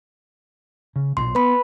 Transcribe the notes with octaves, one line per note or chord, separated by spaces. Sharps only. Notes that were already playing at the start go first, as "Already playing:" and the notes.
C#3
B1 A#2 C6
B3 B4 B5